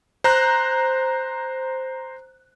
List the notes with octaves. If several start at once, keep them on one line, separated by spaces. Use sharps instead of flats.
C5 A#5 F#6